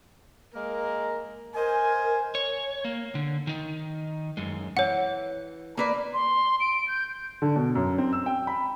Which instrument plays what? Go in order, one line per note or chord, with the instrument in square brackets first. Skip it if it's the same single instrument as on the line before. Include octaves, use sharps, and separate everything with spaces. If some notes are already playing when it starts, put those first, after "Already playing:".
[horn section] G#3 A#3 A#4
[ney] A#4 [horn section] C5 D#5 G#5
[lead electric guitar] C#5
A#3
D3
D#3 D#4
F#2 G#3
[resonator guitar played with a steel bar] E3 [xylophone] C#5 F#5
[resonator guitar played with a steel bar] A#3 B4 D5
[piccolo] C6
D7
G6
[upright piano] D3
B2
F#2
C4
E6
G5
B5